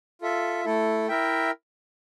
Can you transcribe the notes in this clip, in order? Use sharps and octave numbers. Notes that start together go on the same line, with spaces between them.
F4 A4 E5
A3 E4 A4
E4 A#4 E5 G5